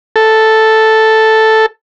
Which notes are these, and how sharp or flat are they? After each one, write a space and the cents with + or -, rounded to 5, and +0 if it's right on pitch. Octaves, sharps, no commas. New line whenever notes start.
A4 +0